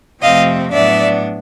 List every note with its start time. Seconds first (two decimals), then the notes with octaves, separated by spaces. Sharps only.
0.22 F2 C3 F3 A3 C4 D#5 F5
0.72 A2 F#3 B3 D4 D5 E5